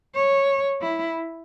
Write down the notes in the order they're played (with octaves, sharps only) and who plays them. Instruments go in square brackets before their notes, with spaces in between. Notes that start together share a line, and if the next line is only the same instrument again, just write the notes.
[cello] C#5
E4